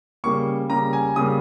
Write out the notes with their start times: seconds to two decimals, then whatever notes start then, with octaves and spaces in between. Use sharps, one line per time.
0.24 C#3 G3 A#3 C#6
0.70 C#3 G3 A#3 A#5
0.93 G#5
1.16 C#3 G3 A#3 D#6